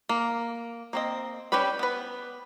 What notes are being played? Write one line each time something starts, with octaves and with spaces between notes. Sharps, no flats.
A#3
A#3 C4 D#5
G3 C#4 G4 B4 B5
B3 B4